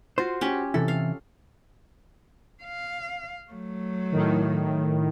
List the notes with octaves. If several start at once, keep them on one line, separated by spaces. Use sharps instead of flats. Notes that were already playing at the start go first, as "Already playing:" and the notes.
F4 F#4 C5
C#4 G4
C3 E3 E4 A4
F5
F5
F#3 A3
A2 D#3